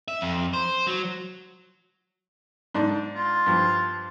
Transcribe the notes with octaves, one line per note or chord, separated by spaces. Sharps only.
E5
F2
C5
F#3
G#2 D4
F4
G2 F3